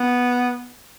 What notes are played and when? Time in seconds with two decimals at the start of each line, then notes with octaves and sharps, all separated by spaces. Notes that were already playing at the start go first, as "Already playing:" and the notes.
Already playing: B3